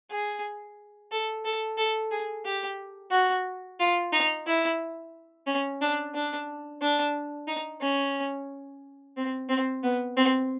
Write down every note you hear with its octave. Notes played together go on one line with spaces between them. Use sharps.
G#4
A4
A4
A4
G#4
G4
F#4
F4
D#4
E4
C#4
D4
D4
D4
D#4
C#4
C4
C4
B3
C4